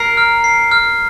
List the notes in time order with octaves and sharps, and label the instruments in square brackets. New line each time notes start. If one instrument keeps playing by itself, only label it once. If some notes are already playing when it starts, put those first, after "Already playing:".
Already playing: [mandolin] A#4 [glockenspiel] C7
[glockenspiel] F6
C7
F6